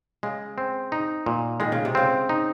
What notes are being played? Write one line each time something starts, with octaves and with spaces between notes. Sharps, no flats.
C#3 G#3
C4
D#4
A#2
D#3 G#3
C#3
C3
C#3 C4
D#4